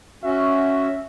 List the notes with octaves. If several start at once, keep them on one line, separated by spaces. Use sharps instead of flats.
C#4 F#4 E5